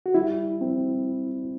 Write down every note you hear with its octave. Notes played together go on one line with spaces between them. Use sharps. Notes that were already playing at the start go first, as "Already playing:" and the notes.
F#4
G3 E4
C4